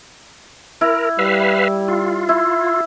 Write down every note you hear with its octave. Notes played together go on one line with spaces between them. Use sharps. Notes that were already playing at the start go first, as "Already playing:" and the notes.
E4 A#4
G3 B4 E5 F5
F4
E4